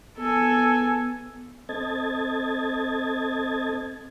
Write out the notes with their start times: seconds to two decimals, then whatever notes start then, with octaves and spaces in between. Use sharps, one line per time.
0.18 B3 A4 G#5
1.69 C4 A4 D#5 G#6 A6